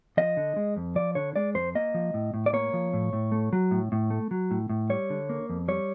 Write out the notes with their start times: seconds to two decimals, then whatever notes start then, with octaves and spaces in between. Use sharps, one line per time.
0.17 F3 D#5
0.37 D3
0.56 G#3
0.77 F2
0.95 F3 D5
1.15 D3 C#5
1.36 G#3 D5
1.55 F2 C5
1.75 A#3 D#5
1.94 F3
2.14 A2
2.34 A2
2.46 D5
2.53 A#3 C#5
2.73 F3
2.93 A2
3.13 A2
3.32 A3
3.53 F#3
3.71 A2
3.92 A2
4.10 A3
4.31 F#3
4.51 A2
4.70 A2
4.90 G3 C#5
5.10 D3
5.29 A#3
5.49 F2
5.68 G3 C#5